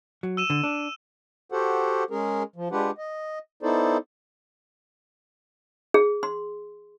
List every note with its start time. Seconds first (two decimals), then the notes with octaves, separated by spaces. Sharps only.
0.23 F#3
0.37 E6 D#7 E7
0.50 D3
0.63 D4
1.52 F#4 G4 A4 C5 F#5
2.11 G#3 C#4 G#4 A#4
2.56 F3
2.72 G#3 D4 F4 G4 B4 F#5
2.98 D#5
3.63 B3 D#4 E4 A4 C5 D5
5.94 G#4
6.23 C6